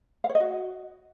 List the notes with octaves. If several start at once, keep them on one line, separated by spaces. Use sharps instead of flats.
F5
C#5
D#5
F#4